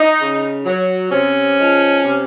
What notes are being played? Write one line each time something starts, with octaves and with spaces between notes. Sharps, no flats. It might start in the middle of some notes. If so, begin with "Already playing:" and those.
Already playing: D#4
C#3
F#3
C3 C#4
F3 G#3
C3